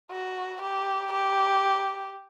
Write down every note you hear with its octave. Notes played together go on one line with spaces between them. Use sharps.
F#4
G4
G4